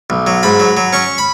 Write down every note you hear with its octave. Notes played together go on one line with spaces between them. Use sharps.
B1
F#3
G#2 B5
F#3
F#3
C#4 C#6
B5